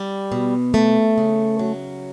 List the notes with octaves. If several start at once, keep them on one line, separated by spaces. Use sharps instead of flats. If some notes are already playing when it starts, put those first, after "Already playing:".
Already playing: G3
B2
A3
C#3
F#3